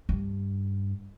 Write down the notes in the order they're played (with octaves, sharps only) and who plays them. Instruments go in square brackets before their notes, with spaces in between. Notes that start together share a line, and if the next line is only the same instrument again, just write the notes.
[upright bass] G2